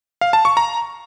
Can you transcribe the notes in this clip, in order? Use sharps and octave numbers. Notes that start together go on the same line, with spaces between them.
F5
A5
C#6
A#5